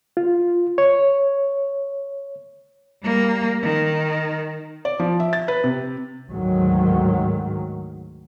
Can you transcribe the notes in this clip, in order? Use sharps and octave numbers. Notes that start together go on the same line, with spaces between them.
F4
C#5
G3 A#3
D#3
D5
F3
E5
A6
B4
C3
D2 G#2 D#3 F#3